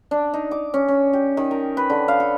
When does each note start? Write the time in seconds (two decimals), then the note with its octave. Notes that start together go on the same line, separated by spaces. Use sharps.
0.11 D4
0.34 D#4
0.51 D6
0.74 C#4
0.88 C#4
1.13 G4
1.37 D#3
1.51 A#4
1.77 B4
1.90 D3
2.08 F5
2.20 A4